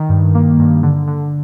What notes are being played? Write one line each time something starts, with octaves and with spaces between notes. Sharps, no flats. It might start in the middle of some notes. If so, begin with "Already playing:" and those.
Already playing: D#3
G2
A#3
G2
D3
D3